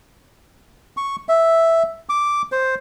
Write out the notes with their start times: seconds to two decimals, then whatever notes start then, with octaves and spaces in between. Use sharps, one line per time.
0.97 C#6
1.29 E5
2.09 D6
2.52 C5